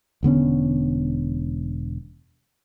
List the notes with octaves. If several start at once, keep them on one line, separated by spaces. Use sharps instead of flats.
E1 D3 B3 C#4